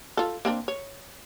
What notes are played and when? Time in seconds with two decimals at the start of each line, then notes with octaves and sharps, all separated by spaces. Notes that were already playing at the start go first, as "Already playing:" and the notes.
0.17 F4 A4
0.45 A#3 C4 D4
0.68 C#5